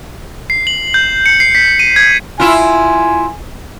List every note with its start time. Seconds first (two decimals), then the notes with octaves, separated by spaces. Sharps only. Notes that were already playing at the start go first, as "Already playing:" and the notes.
0.50 C7
0.67 F#7
0.94 G6
1.26 C#7
1.40 C7
1.55 B6
1.79 D#7
1.96 G#6
2.40 E4 F4 G#5